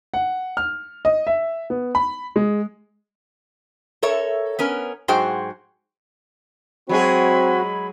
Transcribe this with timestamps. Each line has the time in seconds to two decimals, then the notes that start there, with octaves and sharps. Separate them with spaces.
0.14 F#5
0.57 F6
1.05 D#5
1.27 E5
1.70 B3
1.95 B5
2.36 G#3
4.03 A4 A#4 C#5 E5
4.59 B3 C#4 A#4
5.08 G#2 F#3 F#4 G#4 C5 G5
6.89 F#3 G#3 C4 F#4 G#4 B5